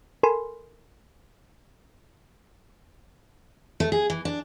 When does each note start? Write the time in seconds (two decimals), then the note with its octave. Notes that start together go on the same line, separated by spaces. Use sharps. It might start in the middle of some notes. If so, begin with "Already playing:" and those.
0.23 A4 A#4 G#5 B5 C6
3.80 A3
3.92 G#4
4.10 E3
4.25 D4